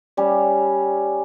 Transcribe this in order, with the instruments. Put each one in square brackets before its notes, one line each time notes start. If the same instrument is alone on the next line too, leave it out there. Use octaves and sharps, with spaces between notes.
[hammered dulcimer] G3 C#4